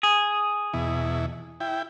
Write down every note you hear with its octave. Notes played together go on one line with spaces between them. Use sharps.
G#4
E2 B2 E4
E4 G5